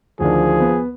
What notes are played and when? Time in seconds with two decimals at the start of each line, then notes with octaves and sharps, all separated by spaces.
0.20 D2 D#3 F3 D4 G#4
0.60 B3